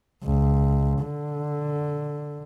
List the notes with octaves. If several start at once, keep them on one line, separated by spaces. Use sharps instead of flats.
C#2
D3